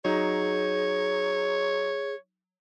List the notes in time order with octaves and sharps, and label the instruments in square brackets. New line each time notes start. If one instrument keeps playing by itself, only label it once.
[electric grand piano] F#3 D#4 [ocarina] G#4 [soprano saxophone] C#5